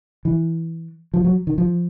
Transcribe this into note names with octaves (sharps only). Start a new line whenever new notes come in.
E3
F3
F#3
D#3
F3